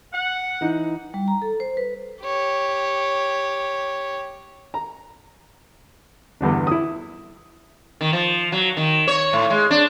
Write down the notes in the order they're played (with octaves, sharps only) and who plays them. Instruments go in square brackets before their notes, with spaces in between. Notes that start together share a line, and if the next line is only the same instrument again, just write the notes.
[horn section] F#5
[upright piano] E3 D#4
[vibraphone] G3
A#5
A4
C5
B4
[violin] G4 C#5
[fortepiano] A#5
E2 G2 D3 D4
E4 D#6
[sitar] D#3
F3
F#3
D#3
C#5
A2
G#3
D4